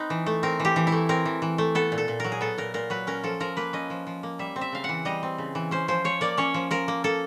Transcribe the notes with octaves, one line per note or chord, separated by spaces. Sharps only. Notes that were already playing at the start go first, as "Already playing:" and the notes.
Already playing: C4 D#4 B4
E3
A3
C4 A#4
E3 G4
E3
E4
A3
C4 A#4
E3
E3
A3
B3 A4
A#2
A4
A#2
F#3 A#4
G#4
B3 A4
A#2 A#4
A#2 A#4
F#3 B4
C#4 A#4
F3 A4
F3 A#4
A#3 B4
C#4 D#5
F3
F3
A#3
G3 E5
C4
E5
C#3 F5
F#5
E3
G3 D#5
C4
C#3
E3
C#4 C5
F3 C5
F3 C#5
A#3 D5
C#4 C#5
F3
F3 A#4
A#3
A#3 A4